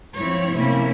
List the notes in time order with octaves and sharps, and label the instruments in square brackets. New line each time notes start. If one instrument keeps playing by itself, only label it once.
[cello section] F3 C4 E4 C#5
A2 C3 A#3 C4 C#4 E4